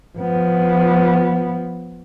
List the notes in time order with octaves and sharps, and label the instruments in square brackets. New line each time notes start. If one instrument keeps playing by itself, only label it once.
[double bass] F3 B3